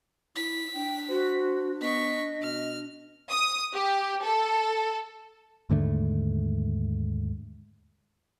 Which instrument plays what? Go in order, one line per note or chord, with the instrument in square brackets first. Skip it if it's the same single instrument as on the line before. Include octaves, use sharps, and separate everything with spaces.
[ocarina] E4 [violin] B6
[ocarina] D4 [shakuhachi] G5
[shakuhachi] F#4 [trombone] C5
[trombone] B3 [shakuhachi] D#5 [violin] C#6 B6
[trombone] B2 [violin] F6
[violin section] D#6
G4
A4
[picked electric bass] D#2 G#2 D3 A3